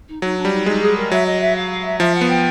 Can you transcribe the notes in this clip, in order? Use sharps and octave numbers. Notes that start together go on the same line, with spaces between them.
D#4
F#3 D#4
D4
G3
D#4
G#3 D#4
G#4
A#4
F#3 E5
D#5
E5
F5
F5
E5
F3 E5
F#5
B3
G5